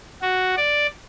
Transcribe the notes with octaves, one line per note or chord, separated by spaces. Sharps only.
F#4
D5